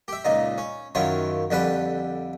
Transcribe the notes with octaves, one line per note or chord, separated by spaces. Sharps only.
G4 E5
C#2 A#2 D#4
C#4
F#2 D#3 E4 F4 C#5
F2 D3 G3 B4 A5 B5